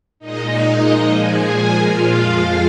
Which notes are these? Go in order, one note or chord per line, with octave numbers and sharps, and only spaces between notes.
A#2 G#3 D#4 D#5
A#2 F3 G#3
G#4 G#5
A#2 F3 G#3
F4 F5
F2 F3 G#3